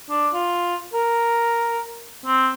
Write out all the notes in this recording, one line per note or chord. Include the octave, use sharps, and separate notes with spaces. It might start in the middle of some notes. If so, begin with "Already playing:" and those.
D4
F4
A#4
C4